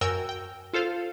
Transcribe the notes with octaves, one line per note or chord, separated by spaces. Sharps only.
F#2 F#4 A#4 G5 G#5 E6
G5
F4 A4 C5 F5